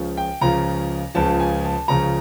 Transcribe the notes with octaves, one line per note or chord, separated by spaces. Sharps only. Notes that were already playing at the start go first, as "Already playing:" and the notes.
Already playing: C#2 C#3 F3
G5
C#2 C#3 F3 A#5
C#2 C#3 F3 A5
G#5
A5
C#2 C#3 F3 A#5